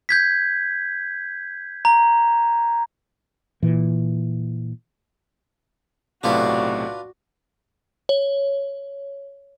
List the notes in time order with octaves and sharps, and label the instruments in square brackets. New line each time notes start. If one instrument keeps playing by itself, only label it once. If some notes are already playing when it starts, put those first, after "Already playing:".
[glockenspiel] G6 G#6 B6
A#5
[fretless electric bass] A#2 E3
[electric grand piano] B1 A2 C3 [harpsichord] D4 F4 B4 [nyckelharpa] F#4 D5
[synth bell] C#5